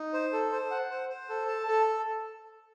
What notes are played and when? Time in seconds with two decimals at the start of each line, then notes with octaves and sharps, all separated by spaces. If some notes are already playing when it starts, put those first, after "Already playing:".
Already playing: D#4
0.13 C5
0.33 A4
0.52 C5
0.71 F#5
0.90 C5
1.09 C5
1.29 A4
1.48 A5
1.68 A4